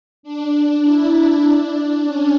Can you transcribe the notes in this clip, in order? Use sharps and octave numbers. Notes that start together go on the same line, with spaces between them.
D4
E4
D4
C#4